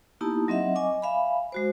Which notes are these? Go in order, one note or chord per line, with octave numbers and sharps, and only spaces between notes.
A#3 B3 D#4 E4 G4 A5
F#3 C4 D#5 E5 F#5
D#5 G#5 C#6 D6
E5 F5 G#5 B5
G#3 F#4 C5